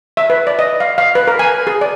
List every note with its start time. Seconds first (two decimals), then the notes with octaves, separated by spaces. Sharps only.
0.17 E5
0.30 B4
0.47 D5
0.59 D#5
0.80 F5
0.98 F5
1.15 B4
1.27 A#4
1.39 G#5
1.67 G#4
1.81 D5